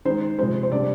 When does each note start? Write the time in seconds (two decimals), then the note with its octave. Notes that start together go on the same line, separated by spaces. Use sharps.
0.05 D#3 G#3 D#4 C5
0.38 C3 F3 G#3 C5
0.63 C5
0.72 C3 G3 D4 D5